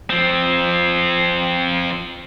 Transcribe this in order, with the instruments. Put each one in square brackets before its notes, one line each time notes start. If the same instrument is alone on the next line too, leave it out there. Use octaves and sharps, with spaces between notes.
[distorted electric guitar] F3 C4